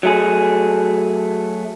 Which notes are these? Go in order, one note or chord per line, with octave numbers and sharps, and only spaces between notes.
F#3 A3 G#4